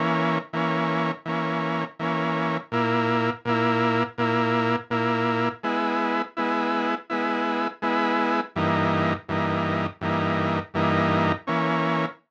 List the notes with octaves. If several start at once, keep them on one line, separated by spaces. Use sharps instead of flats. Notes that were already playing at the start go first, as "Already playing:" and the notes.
Already playing: E3 A#3 C#4
E3 A#3 C#4
E3 A#3 C#4
E3 A#3 C#4
A#2 A#3 E4
A#2 A#3 E4
A#2 A#3 E4
A#2 A#3 E4
G#3 B3 E4
G#3 B3 E4
G#3 B3 E4
G#3 B3 E4
G2 E3 A#3 D#4
G2 E3 A#3 D#4
G2 E3 A#3 D#4
G2 E3 A#3 D#4
E3 A#3 C#4